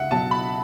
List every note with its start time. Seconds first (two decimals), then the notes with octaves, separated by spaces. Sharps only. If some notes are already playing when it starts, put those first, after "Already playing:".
Already playing: C#2 E5 F#5
0.11 B2 F#3 A5
0.31 B5